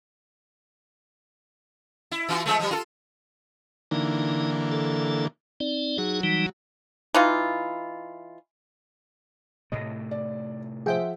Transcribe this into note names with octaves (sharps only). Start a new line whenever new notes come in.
E4
E3 F4 F#4
F3 G#3 A3
F3 G3
F4 A4
D3 E3 A#3 D#4
A4
C4 D#4 D5
F#3 D#4 F#4 G#4
E3 G3 D#4
E3 D#4 F4
A2 C3 A3 D#5
D5
F3 G#4 C5 E5 F#5 G5